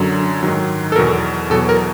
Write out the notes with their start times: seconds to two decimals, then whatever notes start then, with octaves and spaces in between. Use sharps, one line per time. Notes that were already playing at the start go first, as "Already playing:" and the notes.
Already playing: F#2 D3 F#3
0.43 G#2 D#3 F#3
0.92 A4
0.96 E2 B2 F#3 A#4
1.50 E2 B2 F#3 A4
1.69 A#4